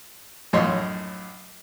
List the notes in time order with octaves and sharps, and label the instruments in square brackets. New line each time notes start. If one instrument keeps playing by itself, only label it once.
[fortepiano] A#1 F#2 A2 C#5 D#5 C6